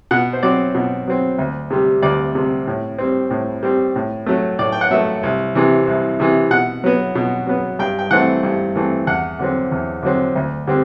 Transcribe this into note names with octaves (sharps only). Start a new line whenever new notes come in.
B2 F#5
C5
F#3 C4 D5
B2
F#3 C4
D2
C3 G3
D2 D5
C3 G3
A2
G3 C4
A2
G3 C4
A2
F#3 A3
A2 D5
G5
F#5
F#3 A3 E5
C2
C3 E3
C2
C3 E3
B2 F#5
F#3 B3
B2
F#3 B3
G2 G5
G5
E3 A3 C4 F#5
G2
E3 A3 C4
E2 F#5
D3 F#3 C4
E2
D3 F#3 C4
D2
D3 G3 C4